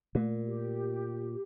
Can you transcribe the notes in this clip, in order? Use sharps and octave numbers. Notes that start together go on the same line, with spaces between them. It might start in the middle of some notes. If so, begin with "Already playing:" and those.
A#2 A3
G4